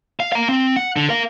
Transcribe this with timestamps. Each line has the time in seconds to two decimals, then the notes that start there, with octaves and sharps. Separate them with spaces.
0.20 F5
0.32 F5 A#5
0.49 C4
0.76 F#5
0.96 D3
1.09 A#4 F5